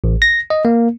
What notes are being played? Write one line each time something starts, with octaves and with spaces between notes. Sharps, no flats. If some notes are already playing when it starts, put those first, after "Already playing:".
A1
A#6
D#5
A#3